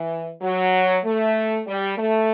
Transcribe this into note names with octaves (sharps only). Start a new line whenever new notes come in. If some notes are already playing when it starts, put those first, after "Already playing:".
Already playing: E3
F#3
A3
G3
A3